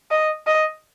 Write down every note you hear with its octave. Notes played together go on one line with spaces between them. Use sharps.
D#5
D#5